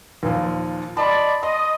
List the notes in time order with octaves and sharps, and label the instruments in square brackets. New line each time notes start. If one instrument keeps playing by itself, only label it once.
[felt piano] D#2 A#2 F3
[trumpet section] D5 D#5 B5 [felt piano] A5 C6
[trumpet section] D#5 [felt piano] C6